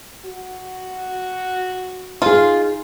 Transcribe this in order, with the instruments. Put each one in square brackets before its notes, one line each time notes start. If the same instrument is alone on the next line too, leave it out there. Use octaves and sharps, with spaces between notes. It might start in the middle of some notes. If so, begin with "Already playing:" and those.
[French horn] F#4
[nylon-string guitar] D#4 G#4 [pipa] F4